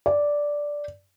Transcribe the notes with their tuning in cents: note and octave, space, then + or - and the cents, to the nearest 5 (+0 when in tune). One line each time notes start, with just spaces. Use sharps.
D5 -5